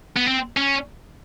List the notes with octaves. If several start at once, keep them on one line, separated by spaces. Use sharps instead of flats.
B3
C4
C#4